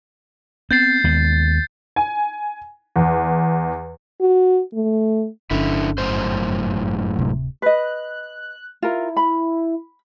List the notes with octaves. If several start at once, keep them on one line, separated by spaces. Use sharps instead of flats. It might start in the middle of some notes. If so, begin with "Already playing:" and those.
B3 C4 G6 A6 C7
D#2 G#3 B3
G#5
E2
F#4
A3
G1 D3 C#4 E4
F#2 A2 C5
D1 C3
B4 D#5 F#6
E4 F4 A#4
B5